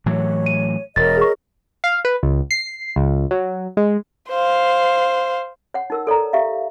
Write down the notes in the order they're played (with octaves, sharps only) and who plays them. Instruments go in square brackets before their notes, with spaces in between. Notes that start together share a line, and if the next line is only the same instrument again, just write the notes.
[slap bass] A2 E3 F#3 [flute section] C#5
[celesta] D#7
[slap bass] E1 [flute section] A#4 C#5 D#5 [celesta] A6
[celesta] G#4 C#6
[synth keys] F5
B4
C#2
C7
C#2
F#3
G#3
[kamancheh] C5 F5
[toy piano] C#5 F#5
D#4 A#4 E6
A4 C#5 D5 A#5
G4 E5 F5